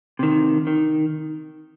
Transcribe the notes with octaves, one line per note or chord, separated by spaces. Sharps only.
C3 D#3
D#3